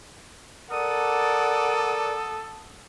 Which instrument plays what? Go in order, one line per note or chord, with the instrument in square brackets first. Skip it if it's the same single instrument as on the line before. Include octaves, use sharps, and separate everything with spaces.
[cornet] A4 [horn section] A#4 D5 [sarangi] F#5 [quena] D#6